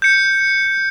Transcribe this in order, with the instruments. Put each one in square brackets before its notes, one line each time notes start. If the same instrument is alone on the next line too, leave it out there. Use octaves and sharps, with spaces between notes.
[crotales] G6 C#7